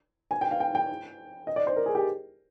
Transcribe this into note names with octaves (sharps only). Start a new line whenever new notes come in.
G#5
G5
F5
G5
G5
D#5
D5
C5
A#4
G#4
G4